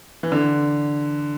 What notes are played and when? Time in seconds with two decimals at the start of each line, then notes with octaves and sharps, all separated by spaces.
0.23 E3
0.32 D3